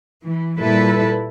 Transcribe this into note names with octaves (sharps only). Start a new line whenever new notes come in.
E3
A#2 G3 E4 A4 B4